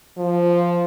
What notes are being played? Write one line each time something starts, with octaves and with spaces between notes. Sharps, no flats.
F3